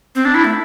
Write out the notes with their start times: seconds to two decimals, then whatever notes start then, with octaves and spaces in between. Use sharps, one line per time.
0.15 C4
0.25 D4
0.34 E4
0.44 A3